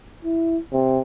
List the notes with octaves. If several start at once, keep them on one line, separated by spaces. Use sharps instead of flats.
E4
C3